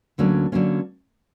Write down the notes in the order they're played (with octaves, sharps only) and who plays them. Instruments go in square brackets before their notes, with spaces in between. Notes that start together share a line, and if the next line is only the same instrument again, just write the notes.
[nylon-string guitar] D2 D3 F#3 A#3 C#4
D3 F#3 A#3 C#4